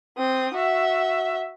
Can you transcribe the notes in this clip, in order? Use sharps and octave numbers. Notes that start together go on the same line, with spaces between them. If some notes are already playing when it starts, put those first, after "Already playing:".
C4 D#6
F#4 E5